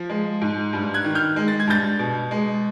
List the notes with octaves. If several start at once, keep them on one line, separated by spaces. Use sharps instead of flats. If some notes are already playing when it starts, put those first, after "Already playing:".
Already playing: F3
G#3
G#2
G2
F#6 G#6
D#3
F6 G6
G#3
A6
G#6
G2 G6 A6
B2
G#3